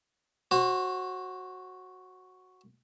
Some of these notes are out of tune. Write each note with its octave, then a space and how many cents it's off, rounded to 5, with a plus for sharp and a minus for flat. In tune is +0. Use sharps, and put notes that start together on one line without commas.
F#4 +0 C5 +35